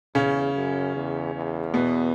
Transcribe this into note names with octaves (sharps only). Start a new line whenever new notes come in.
E2 C#3 C#4
F#2
E2
E2
B2 B3